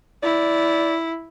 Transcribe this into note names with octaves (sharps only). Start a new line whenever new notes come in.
E4 D5